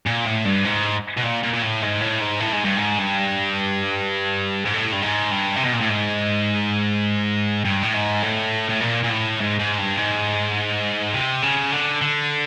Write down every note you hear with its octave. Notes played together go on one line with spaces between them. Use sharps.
A#2
A2
G2
G#2
B2
A#2
A#2
A#2
A2
G#2
A2
G#2
A2
G#2
G2
G#2
G2
G#2
A2
G2
G#2
G2
C3
B2
A#2
A2
G#2
G2
A2
G#2
A2
A2
A#2
A#2
A2
G#2
G#2
G2
G#2
C3
C#3
D3
D3